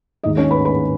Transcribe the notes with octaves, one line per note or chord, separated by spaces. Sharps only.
D#2 D#3 G#3 D#4 D#5
C#4 C#5
B4 B5
B4 B5